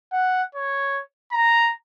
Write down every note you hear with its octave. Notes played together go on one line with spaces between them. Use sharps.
F#5
C#5
A#5